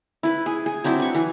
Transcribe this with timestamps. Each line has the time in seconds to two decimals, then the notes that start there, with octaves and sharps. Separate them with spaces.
0.23 E4 B4
0.46 G#4
0.66 G#4
0.84 F#3 C4 D4 E4
1.00 B4 C#6
1.15 E3